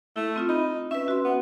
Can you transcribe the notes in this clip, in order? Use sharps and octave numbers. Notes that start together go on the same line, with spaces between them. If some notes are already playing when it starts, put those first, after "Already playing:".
A3 E4
C4 F4 D#6
D#4 B5
C#4 B4 E5
F#4 C6
B3